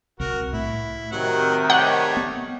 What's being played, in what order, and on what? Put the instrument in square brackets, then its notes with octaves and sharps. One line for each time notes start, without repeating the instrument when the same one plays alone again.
[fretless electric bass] C2 [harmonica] F#4 A#4
[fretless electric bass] A2 [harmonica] E4
[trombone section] C3 D#3 [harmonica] F#3 F#5
[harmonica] G3 A3 C#5 [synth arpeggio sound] F#5 G6
[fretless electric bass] B3